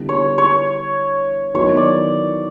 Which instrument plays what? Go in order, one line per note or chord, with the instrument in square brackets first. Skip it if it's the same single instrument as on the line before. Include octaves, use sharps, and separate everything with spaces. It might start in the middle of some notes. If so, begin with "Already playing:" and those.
Already playing: [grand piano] D3 G3 B3 E4
[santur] C#5
C#5
[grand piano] D#3 F#3 B3 E4 [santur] C#5
[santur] D5